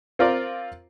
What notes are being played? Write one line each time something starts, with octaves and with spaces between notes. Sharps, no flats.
C4 F4 A#4 D5